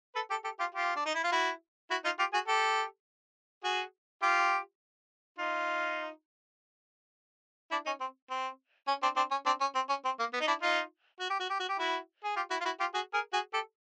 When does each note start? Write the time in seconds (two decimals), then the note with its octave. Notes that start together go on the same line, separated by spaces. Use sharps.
0.15 A4 B4
0.30 G4 A4
0.45 G4 A4
0.59 F4 G4
0.75 F4 G4
0.96 D4
1.06 D#4
1.15 E4
1.24 F4
1.32 E4 F#4
1.91 E4 F#4
2.05 D#4 F4
2.19 F4 G4
2.33 F#4 G#4
2.48 G4 A4
3.64 F#4 G#4
4.22 F4 G4
5.39 D#4 F4
7.71 D4 E4
7.86 C#4 D#4
8.00 C4
8.30 C4
8.88 C#4
9.03 C4 D4
9.16 C4 D4
9.31 C#4
9.46 C4 D4
9.61 C#4
9.75 C4
9.89 C#4
10.05 C4
10.19 A#3
10.33 B3
10.41 D#4
10.48 D4 E4
10.62 D#4 F4
11.20 F#4
11.30 G4
11.40 F#4
11.50 G4
11.60 F#4
11.69 G4
11.79 E4 F#4
12.24 G#4
12.36 F4 G4
12.51 E4 F#4
12.61 F4
12.65 E4 F#4
12.80 F4 G4
12.94 F#4 G#4
13.14 G#4 A#4
13.33 F#4 G#4
13.54 G4 A4